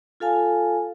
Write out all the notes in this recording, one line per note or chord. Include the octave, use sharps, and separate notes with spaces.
F4 A4 F5 G#5 A5